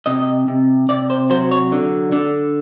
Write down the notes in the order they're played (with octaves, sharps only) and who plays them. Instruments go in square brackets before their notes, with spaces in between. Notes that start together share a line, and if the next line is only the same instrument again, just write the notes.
[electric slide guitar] C3 D#5
C3
C3 D5
C5
F#3 C5
C#5
D3
D3